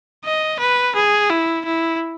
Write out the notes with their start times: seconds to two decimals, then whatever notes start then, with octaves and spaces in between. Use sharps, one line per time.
0.25 D#5
0.60 B4
0.95 G#4
1.30 E4
1.65 E4